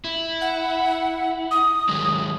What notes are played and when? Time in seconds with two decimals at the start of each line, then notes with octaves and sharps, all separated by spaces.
0.04 E4
0.41 F#5
1.51 D#6
1.89 D#3 F#3 G#3